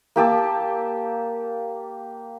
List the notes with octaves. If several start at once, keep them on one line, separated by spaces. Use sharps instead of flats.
A#3 G4 A5 E6